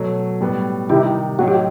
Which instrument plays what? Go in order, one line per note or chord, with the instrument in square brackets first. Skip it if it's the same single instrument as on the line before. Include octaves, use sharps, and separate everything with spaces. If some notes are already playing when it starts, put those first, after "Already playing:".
Already playing: [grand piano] B2 F#3 A3
A2 G3 B3
[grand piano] C3 D#3 G3 D#4 [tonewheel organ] E4 G4
[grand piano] A2 F#3 C4 D#4 [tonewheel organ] F#4
[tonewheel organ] G4